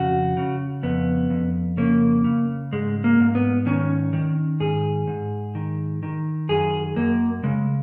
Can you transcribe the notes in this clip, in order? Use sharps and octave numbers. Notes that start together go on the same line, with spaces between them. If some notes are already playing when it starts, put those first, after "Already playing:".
Already playing: F2 C#3 F#4
C#3
F2 B3
F2
C#3 A#3
C#3
G#2 G#3
A#3
G#2
B3
D#3 C#4
D#3
G#2 G#4
G#2
D#3
D#3
F#2 G#4
F#2 A#3
C#3 G#3